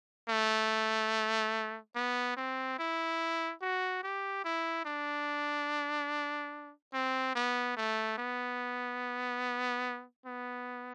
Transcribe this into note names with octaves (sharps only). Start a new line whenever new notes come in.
A3
B3
C4
E4
F#4
G4
E4
D4
C4
B3
A3
B3
B3